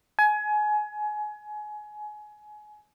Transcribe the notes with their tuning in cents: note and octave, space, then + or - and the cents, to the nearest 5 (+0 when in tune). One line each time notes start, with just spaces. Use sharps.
G#5 +25